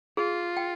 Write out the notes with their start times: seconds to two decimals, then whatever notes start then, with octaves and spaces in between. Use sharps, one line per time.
0.17 F4 G#4
0.57 G5